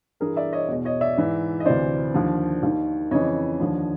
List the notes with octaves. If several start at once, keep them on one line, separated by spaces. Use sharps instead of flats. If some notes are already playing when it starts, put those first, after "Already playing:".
G2 E3 G#4 A#4
D5 E5
C#5 D#5
E2 B2
C#5 D#5
D5 E5
G#2 E3
D#5
D2 C3 E3 C5 D5
D#2 D3 F3
D#2 D#3
F2 C#3 E3 C#5 D#5
D#2 D3 F3